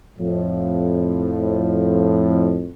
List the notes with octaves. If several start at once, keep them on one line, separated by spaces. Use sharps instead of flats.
F2 A2 F3